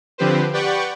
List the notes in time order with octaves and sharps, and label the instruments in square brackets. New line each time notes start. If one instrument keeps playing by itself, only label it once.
[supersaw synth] D3 F3 C4 G4 B4 C5
G4 B4 D5 F#5 G5 C#6